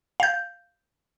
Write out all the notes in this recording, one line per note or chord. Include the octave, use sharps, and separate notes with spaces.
F5 G6